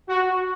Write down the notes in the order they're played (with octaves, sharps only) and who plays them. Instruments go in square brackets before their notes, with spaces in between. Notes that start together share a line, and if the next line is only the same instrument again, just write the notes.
[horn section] F#4